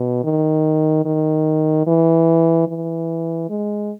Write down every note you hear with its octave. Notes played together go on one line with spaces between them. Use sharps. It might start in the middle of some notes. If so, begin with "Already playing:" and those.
Already playing: B2
D#3
D#3
E3
E3
G#3